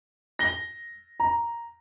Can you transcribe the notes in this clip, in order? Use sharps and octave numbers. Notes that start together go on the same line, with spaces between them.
A#6 G7
A#5